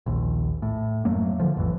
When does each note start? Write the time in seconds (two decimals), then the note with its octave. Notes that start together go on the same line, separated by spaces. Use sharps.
0.06 A#1 D#2
0.62 A2
1.05 F#2 F#3 A3 A#3
1.40 D3 F3
1.57 A1 F2 E3